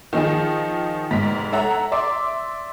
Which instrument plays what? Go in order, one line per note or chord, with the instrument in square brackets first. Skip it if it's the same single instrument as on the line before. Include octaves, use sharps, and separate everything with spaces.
[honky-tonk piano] D#3 F3 D#4 G#4
F1 G#2 B6
A4 C#5 E5 F#5 A#5
D5 E5 C6 D6